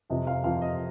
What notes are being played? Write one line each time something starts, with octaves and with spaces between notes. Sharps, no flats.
F2 C3 F3 D#5
F5
F2 C3 F3 F5
D#5